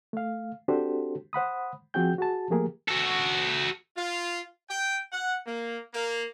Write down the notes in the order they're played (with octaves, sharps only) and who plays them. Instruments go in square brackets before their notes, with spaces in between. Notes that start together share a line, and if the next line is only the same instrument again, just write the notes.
[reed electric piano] A3 F5
C4 D4 F#4 G4 A4 C5
C5 F#5 B5 D#6
F3 C4 F#4 G#4 G5 G6
F#4 G#4 A5
F3 A3 A#3 G4 G#4 A#4
[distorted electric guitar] F#4 A4
[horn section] F4
G5
F#5
A#3
A#3